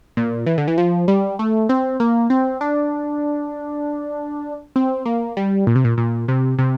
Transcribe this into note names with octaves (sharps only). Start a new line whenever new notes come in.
A#2
E3
D3
E3
F3
G3
A3
C4
A#3
C4
D4
C4
A#3
G3
A#2
C3
A#2
A#2
C3
C3